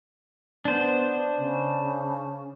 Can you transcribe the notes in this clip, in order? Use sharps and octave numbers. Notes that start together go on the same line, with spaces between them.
B3 D4 C5
C#3